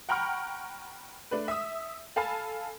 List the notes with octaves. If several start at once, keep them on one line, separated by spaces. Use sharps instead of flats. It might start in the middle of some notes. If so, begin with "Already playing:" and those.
F#5 G5 A#5 B5 C#6 F6
A3 D4 B4
E5 D#6
A4 F5 G#5 A5 B5